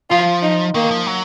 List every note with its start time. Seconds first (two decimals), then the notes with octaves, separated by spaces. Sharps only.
0.10 F3 F4
0.42 D#4
0.74 D#3 A#3
0.91 F3
1.06 F#3